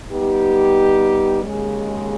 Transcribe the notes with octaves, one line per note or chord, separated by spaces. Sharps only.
G3 B3 D#4 G4
D#2 C#3 G#3